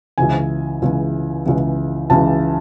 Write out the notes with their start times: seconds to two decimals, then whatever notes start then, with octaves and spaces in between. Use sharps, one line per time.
0.18 C#2 C#3 E3 G#5
0.82 C#2 C#3 E3
1.46 C#2 C#3 E3
2.10 C#2 C#3 E3 A5